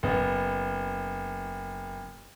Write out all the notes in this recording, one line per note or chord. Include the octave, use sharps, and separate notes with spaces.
F#1 B3